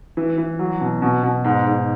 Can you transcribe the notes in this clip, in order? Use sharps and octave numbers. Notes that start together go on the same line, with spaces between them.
E3
E3
F#3
B2
B2
B2
G#2
G#2